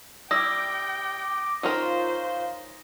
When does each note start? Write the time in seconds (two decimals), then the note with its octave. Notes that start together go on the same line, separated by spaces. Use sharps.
0.31 G3 E4 G5 D6 D#6 A#6
1.63 D#3 C#4 F4 A#4 C5